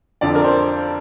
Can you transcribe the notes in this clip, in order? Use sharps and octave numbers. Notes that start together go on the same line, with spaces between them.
F2 D3 F3 D5
A#4
C5